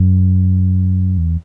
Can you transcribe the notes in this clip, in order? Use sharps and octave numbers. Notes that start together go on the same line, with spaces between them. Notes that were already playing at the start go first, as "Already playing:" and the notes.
Already playing: F#2
E2